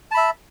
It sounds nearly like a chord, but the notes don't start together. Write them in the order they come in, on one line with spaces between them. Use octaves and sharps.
A5 B5 E5